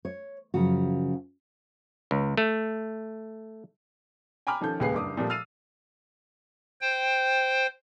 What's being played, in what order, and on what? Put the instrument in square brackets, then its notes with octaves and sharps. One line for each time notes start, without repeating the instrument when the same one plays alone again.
[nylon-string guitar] C#5
F#2 C#3 F3 F#4
[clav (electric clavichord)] C#2
A3
[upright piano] G5 G#5 A#5 B5 D6 F6
D#3 F3 C#4 A4 G6
D#1 C#2 A#3 G#4 B4 C7
F#1 G2 D6 D#6
A#2 F3 G3 A3
E6 F6 A6 C7 D#7 F7
[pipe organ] C5 G5